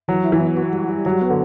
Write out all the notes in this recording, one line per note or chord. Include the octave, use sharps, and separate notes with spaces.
E3 F#3
E4
E3
B3
F#4
G3
G3
F#3 F#4
B3
D3